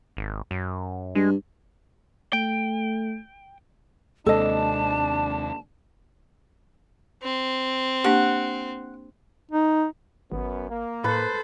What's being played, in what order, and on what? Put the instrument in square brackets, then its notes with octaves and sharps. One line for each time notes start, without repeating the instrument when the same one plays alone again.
[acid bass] G#1
F#2
[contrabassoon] G2 [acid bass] G#3
[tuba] A3 [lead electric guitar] G5
[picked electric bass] D#2 C3 G#3 [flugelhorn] D4 [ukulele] A4 D#5 [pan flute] A5
[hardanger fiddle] C4
[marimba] A#3 D4 G4 [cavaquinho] F#5
[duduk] D#4
[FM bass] G#1 [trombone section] F#2 B3
[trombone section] A#3
[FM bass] A2 [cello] A4 C5 [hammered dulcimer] B4